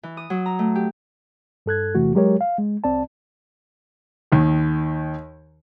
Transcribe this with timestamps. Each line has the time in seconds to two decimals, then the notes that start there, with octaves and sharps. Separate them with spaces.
0.03 E3
0.17 D#6
0.30 F#3
0.46 A#5
0.59 A3
0.75 G4
1.66 G2 A4 F#6 G#6
1.95 E2 C3 E3 A3 F#4
2.15 F#3 G#3 G4 A#4 C#5
2.41 F5
2.58 G#3
2.84 C2 C4 D5 A5
4.32 D#2 D#3